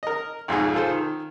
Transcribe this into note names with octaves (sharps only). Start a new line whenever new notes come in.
A#4 D#5
B1 F2 G#2 G#4
F4 G#4 A4 C5
D#3